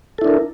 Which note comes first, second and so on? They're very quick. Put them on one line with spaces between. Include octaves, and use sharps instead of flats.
A4 E4 D4 A#4